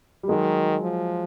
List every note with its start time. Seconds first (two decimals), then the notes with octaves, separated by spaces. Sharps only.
0.23 G3
0.29 D#3 F#3 G#3
0.83 F3